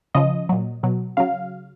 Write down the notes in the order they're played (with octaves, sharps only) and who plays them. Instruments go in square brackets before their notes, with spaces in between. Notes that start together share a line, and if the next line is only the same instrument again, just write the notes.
[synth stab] C#3 F3 D#5
A#2 F#3
B2 F#3
C#3 F#3 F5